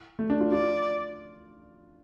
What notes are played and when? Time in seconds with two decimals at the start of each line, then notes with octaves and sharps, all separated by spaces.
0.19 A3
0.30 D4
0.41 F4
0.52 F4 D5